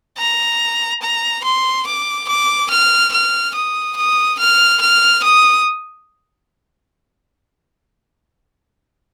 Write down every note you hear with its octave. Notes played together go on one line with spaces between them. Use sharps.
A#5
A#5
C6
D6
D6
F6
F6
D#6
D#6
F6
F6
D#6